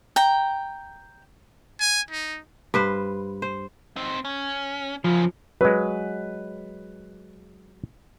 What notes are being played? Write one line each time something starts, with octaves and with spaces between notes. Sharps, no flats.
G5 A#5
G#5
D#4
G2 B4 C5
C5
C4 D#4
C#4
F#2 C#3 F3
F#3 G#3 B4